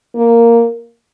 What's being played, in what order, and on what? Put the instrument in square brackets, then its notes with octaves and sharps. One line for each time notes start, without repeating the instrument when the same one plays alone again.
[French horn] A#3